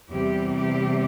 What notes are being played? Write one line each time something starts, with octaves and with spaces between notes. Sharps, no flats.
E2 C3 G3 G4
G4